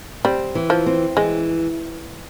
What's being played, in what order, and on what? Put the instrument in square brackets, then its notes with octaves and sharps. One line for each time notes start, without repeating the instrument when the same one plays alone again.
[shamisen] G3 [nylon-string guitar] C4
[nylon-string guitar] E3
[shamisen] F3
[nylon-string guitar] C4
[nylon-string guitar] E3 [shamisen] G#3